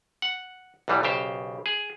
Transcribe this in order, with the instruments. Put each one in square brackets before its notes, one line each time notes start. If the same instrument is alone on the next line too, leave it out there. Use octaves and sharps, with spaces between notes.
[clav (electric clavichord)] F#5
B1 E2 E3 G3
B1 C#3 G4 C5
G#4